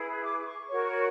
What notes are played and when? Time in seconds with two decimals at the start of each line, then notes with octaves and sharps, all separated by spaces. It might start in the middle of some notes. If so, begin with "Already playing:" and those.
Already playing: E4 G#4 B4
0.23 D6
0.40 D6
0.46 C#6
0.69 F#4 A#4 C#5